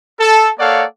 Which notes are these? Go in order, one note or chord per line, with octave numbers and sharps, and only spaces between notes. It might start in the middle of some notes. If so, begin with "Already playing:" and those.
A4
A#3 A4 C#5 D5 F5 F#5